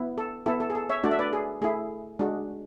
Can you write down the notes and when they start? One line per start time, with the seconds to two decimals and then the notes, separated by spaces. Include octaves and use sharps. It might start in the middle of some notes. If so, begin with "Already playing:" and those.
Already playing: B3 E4
0.18 A4
0.46 B3 E4 A4
0.60 A4
0.70 G#4
0.75 A4
0.90 C#5 E5
1.03 A3 D4 F#4 D5
1.11 E5
1.19 B4 D5
1.33 G#4
1.62 A3 E4 G#4
2.19 G#3 D4 F#4